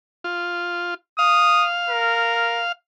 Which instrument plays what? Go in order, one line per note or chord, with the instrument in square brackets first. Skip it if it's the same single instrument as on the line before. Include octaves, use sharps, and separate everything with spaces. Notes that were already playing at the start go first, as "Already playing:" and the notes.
[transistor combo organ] F4
[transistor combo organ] F5 [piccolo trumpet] D#6
[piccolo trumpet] A#4